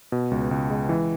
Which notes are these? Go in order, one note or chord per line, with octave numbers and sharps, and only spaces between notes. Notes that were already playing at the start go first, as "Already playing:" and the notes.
B2
C#2
C#2
G#3
E3